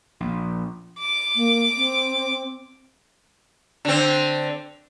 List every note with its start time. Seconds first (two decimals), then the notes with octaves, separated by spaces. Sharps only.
0.20 A#1
0.99 D6
1.36 A#3
1.77 C4
3.85 D3 C4